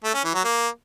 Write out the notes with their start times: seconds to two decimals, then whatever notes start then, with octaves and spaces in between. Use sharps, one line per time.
0.04 A3
0.14 C#4
0.24 E3
0.34 F#3
0.45 A#3